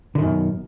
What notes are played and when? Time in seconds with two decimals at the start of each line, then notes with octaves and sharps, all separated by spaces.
0.15 D3
0.19 D#3
0.22 F#2
0.25 B2